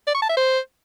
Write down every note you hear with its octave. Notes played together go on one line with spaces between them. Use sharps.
D5
C#6
A5
E5
C5